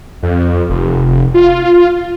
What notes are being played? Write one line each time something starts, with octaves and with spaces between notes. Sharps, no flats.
F2
F1
F4